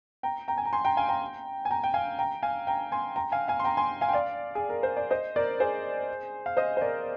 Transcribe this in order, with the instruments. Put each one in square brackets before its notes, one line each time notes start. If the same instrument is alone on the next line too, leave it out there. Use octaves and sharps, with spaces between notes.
[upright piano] G5 A#5
G5 A#5
G#5
A#5
G#5 C6
G5 A#5
F5 G#5
G5 A#5
G#5
G5 A#5
G5
F5 G#5
G5 A#5
F5 G#5
G5 A#5
G#5 C6
G5 A#5
F5 G#5
F5 G#5
C6
G5 A#5
G#5 C6
F5 G#5
G5
D5 F5
G#4
A#4
C5
D5
C5 D#5
A#4 D5
G#4 C5
F5
C5 D#5
C5
A#4 D5